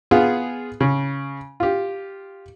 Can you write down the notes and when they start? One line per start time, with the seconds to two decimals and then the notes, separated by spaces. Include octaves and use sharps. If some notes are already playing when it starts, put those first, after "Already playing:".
0.11 B3 F4 G#4
0.81 C#3
1.60 F4 G4